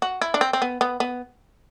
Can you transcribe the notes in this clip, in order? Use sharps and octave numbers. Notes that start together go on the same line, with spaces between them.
F#4
E4
D4
C4
C4
B3
B3
B3